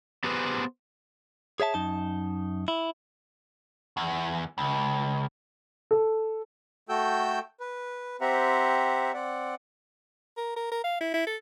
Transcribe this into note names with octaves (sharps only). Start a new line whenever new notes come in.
B3 G4 G#4 B4 C5
G#4 C#5 E5 A5
F#2 D#4 A5
E4
E2
C#2
A4
A3 F#4 A4 G5 E6 G6
B4
C4 G4 C5 E5 F#5 A#5
C4 D5 F#5
A#4
A#4
A#4
F5
E4
E4
A4